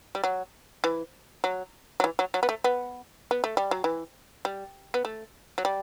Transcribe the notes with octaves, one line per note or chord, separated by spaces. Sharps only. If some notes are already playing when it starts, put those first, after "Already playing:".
G3
F#3
E3
F#3
F#3
E3
F#3
F#3
B3
A3
B3
B3
A3
G3
F#3
E3
G3
B3
A3
F#3
G3